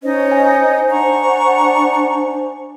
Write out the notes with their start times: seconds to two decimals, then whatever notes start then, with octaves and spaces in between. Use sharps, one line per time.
0.03 C#4 D#4 C5 C#5 D#5
0.32 G#5
0.89 D4 F#5 A#5 C#6